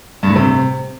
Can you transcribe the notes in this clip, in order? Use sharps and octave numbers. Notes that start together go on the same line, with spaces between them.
G2
A2
C3